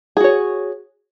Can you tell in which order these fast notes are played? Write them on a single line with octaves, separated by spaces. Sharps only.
G#4 F#4 C#5